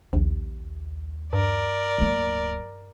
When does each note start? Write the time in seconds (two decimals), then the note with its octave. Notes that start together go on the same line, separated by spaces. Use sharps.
0.13 A#1 D#2
1.33 G2 A#4 D5
1.98 D1 A#3